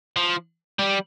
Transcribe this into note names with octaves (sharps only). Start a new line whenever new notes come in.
F3
G3